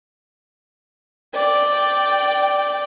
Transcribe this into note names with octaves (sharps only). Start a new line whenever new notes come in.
D5 G5